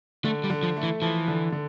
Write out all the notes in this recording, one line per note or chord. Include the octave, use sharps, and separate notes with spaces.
D3 A3
G3
D3
F3
A3
E3
E3 F3
D3
D3